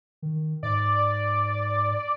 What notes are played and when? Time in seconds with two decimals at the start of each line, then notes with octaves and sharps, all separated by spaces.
0.22 D#3
0.63 G#2 D5